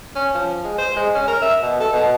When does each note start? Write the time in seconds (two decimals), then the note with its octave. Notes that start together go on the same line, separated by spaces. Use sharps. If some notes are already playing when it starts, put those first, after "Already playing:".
0.16 C#4
0.35 F3
0.65 G#3
0.78 C5
0.96 G#3
1.15 C#4
1.28 A#4
1.42 E5
1.62 B2
1.80 A4
1.93 B2